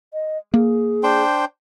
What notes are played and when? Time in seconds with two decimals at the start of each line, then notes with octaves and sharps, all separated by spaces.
0.13 D#5
0.54 A#3 G#4
1.03 D4 C5 G5